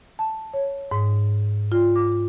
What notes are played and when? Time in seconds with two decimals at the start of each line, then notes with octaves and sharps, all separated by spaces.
0.19 A5
0.53 C#5
0.91 G#2
1.72 F4
1.96 D6